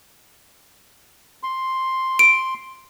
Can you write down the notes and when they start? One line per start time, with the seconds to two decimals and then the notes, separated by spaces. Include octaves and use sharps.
1.43 C6
2.19 D7